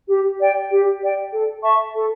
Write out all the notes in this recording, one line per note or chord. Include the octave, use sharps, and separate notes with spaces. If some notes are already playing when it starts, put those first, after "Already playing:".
G4
D5 G5
G4
D5 G5
A4
E5 A5 C#6
A4